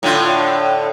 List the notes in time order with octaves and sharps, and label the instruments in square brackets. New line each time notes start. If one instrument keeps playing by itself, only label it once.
[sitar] A2 D3 F4